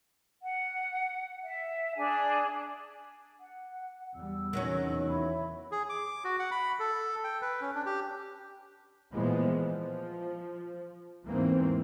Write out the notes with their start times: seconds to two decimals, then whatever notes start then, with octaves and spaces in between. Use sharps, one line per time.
0.41 F#5
1.43 E5
1.95 D4 G#4 G#5 A5
3.40 F#5
4.15 E2 G3 E6
4.53 E2 C3 D#3 E3 F#3 C#4
5.08 E4 C#5 B5
5.72 G#4
5.89 D6
6.24 F#4
6.39 F#5
6.51 B5
6.79 A4
7.24 G5
7.41 B4
7.61 C#4
7.75 D4
7.86 G4
9.13 A#2 E3 F3 G#3 B3
9.64 F3
11.25 E2 G#2 E3 A#3 C4